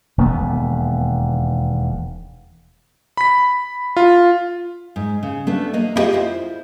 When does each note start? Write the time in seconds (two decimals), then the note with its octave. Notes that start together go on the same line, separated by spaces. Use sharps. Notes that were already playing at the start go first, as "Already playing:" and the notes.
0.18 E1 D#2 A#3 B3
3.17 B5 B6
3.97 F4
4.96 G#2
5.23 C#3
5.47 A3 B3 D4
5.74 A#3 D#5
5.96 E4 F4 G4 G#4 D#5
6.13 E4 F4 C5